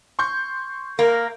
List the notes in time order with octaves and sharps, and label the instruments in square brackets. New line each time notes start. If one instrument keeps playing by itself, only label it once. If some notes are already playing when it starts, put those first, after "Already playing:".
[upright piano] C6 C#6 G6
[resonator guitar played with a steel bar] A#3 [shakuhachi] A#4